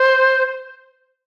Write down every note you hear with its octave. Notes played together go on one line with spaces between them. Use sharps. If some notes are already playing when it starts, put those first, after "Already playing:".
Already playing: C5